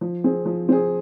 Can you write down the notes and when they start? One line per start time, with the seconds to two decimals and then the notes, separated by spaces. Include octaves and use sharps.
0.01 F3
0.24 C4 G#4
0.45 F3
0.69 C4 G#4